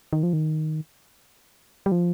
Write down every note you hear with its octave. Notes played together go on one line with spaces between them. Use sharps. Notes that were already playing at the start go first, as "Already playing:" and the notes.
D#3
F3
D#3
G3
F3